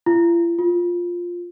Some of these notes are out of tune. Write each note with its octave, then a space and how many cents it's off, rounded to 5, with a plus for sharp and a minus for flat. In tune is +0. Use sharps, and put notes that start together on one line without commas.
F4 -45
F4 +5